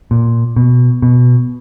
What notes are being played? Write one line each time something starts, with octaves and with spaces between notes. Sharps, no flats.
A#2
B2
B2